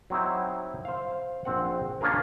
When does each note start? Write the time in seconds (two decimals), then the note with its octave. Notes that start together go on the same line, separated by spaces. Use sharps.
0.10 F#3 C4 D#4 E4
0.85 C5 F5
1.45 A#1 C4 F#5
2.01 A#3 C#4 D4 F4 G#4 A#4